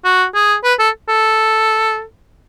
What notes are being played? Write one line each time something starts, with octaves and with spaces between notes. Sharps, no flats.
F#4
G#4
B4
A4
A4